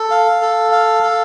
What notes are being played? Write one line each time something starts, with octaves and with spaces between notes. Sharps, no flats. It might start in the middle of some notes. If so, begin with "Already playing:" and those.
Already playing: A4
F5
A4
F5
A4